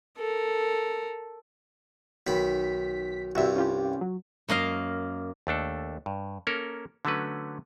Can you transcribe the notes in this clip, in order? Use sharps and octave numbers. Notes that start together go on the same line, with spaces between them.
A4 A#4
B1 D#3 B5 B6
C2 G2 F#4 E5
C#4 F4 G4
F#3
F#2 A#3 D#5 F5
D#2 A3 D4 A4
G2
A#3 C#4 A4 A#4
D3 F#3 A3 C#4 B4